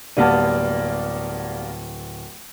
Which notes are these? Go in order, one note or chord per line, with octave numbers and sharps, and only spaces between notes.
D1 G3 A#3 B3 D5 A5 F6